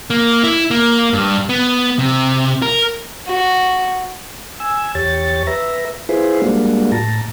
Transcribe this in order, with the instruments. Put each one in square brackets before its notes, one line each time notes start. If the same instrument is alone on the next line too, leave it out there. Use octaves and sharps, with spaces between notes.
[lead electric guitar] A#3
E4
A#3
G2
B3
C3
A#4
[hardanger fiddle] F#4
[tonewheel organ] G#5 E6
E2 G4 C#5 A6
B4 E5 A#5
E4 F4 G#4 B4 C5
G3 G#3 A#3 D4 F4 F#4
A2 A5 A#5